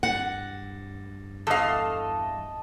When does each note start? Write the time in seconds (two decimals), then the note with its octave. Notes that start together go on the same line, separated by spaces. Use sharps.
0.03 G2 F#5
1.47 E2 A4 D#5 F5